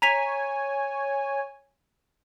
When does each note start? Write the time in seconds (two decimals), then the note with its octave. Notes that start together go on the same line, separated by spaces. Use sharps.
0.02 C#5 G#5 A#5 B6 F7